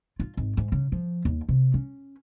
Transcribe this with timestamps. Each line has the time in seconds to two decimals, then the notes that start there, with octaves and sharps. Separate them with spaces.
0.20 F4
0.37 G#1
0.57 G#2
0.72 C#3
0.92 F3
1.25 D#2
1.49 C3
1.74 C#4